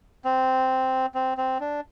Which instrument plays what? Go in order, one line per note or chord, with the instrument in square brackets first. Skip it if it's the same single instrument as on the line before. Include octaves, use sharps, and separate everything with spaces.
[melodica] C4
C4
C4
D4